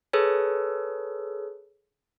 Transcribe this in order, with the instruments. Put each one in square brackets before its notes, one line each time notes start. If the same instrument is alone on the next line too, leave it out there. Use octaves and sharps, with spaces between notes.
[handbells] G#4 A4 B4 C#5